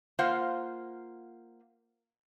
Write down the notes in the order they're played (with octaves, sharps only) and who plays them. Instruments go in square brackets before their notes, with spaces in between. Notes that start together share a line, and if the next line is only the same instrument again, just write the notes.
[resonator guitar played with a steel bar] A#3 F4 C5 F5 F#5